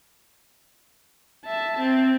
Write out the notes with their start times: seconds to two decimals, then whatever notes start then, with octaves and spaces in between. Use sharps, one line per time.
1.45 E5 A5
1.79 C4